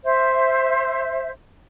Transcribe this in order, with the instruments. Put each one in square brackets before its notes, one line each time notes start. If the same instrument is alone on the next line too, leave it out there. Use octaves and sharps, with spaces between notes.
[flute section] C5 E5